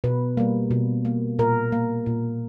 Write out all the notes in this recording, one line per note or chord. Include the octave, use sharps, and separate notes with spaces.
B2 B4
G3 A#3
B2
A#3
A#2 A#4
A#3
A#2